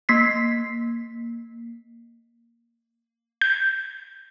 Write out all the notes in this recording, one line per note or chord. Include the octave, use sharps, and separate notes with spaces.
A#3 B6 C7
G6